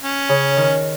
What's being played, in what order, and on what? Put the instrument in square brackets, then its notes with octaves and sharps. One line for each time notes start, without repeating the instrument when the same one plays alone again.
[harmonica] C#4
[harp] C#3
D#3